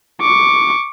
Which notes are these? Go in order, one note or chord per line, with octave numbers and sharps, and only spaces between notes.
C#6 D6